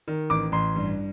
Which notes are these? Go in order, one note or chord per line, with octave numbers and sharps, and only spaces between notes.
D#3
A1 D6
A1 C6
G2